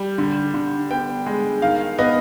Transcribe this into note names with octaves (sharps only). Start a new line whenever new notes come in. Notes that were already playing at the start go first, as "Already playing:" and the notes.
Already playing: G3
D3
D3
B3 G5
G#3
D#3 F5
B3 D#5